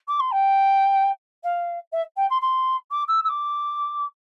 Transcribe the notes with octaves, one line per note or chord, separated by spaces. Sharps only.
D6
C6
G5
F5
E5
G5
C6
C6
D6
E6
E6
D6